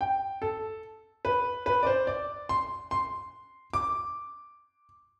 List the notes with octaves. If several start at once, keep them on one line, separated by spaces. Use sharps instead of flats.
G5
A4
B4
B4
D5
C5
D5
C6
C6
D6